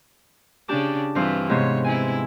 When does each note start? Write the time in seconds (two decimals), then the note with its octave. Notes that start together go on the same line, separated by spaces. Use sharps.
0.68 C#3 D4 G4 A5 D6
1.15 G2 E3 C4 F4 F5
1.49 G#2 C3 B3 C#5
1.84 C4 E4 G#5